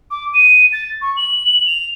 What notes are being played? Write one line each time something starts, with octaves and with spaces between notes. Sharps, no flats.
D6
D#7
A6
C#6
F#7
F7